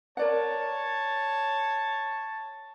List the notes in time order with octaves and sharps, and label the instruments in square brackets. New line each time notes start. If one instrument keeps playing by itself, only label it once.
[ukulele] A#4 D5 F#5 [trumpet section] C#5 A5